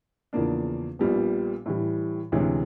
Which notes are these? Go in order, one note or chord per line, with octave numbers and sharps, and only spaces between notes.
E2 C#3 F3 A#3 D4
A#1 A#2 G3 B3
A2 E3 G3
D2 C3 E3 G#3 C#4